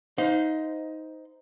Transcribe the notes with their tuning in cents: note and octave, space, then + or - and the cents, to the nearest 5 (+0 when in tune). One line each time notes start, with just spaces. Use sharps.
D#4 +15 C5 -15 F5 +35